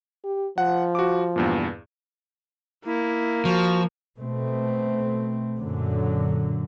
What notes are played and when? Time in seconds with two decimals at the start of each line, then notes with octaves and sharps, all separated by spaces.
0.24 G4
0.58 F3 F#5
0.95 F#4 D6
1.36 E2 G2 A#2
2.86 A#3 E4
3.45 F3 F#4
4.18 B2 A3 C4
5.58 F#2 A#2 D3 F#3